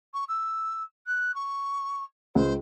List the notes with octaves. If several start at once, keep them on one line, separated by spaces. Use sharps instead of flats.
C#6
E6
F#6
C#6
C#2 C5